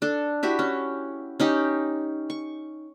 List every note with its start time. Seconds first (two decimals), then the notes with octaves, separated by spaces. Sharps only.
0.02 D4 A4
0.43 E4 F#4 G4 E5
0.59 C#4
1.40 C#4 D#4 G4
2.30 C#6